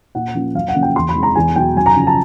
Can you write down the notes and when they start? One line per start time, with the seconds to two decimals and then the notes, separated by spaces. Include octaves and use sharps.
0.15 A#2 F#5
0.34 F3 A#3 C#4
0.54 F#2 F5
0.68 F#5
0.75 C#3 F3 A#3 C#4
0.83 G5
0.96 E2 C6
1.09 B5
1.15 C3 E3 G#3
1.23 A#5
1.35 E2 G#5
1.56 B2 F#3 G5
1.76 F#2 G#5
1.86 A#5
1.96 C#3 F3
2.07 A5